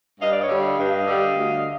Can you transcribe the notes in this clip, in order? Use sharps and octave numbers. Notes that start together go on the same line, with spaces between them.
G2 D#5 F5
D5
C#5 D#5
D3 G3
D#5 F5
G2
D3 G3
D2